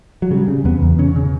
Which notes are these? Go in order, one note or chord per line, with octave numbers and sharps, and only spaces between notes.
F#3
C#3 G3
C#3
E2 B3
E2
C#3 C#4
C#3